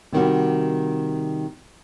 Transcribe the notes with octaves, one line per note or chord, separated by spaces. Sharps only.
C3 D#3 G3 F#4